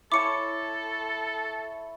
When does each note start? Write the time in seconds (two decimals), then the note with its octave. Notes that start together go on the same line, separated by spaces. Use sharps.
0.12 E4 A4 C#5 A5 D6 C#7